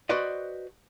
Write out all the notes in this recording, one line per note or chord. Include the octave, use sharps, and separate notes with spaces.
F#4 B4 C5 D5 D#5